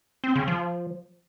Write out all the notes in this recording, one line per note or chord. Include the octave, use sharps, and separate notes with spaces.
C4
C#3
F3